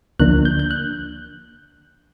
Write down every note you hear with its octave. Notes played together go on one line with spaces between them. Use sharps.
D2 D3 F3 A#3 D4 F#6
G6
G6
F#6